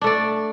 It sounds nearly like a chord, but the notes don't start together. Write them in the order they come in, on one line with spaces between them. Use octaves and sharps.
D4 A3 D5